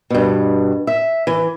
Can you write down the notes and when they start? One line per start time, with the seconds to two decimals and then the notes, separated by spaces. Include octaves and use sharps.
0.10 G2 B2
0.87 E5
1.27 E3